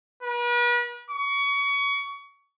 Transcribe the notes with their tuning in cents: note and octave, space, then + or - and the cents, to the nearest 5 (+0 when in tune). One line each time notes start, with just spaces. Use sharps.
B4 -40
C#6 +25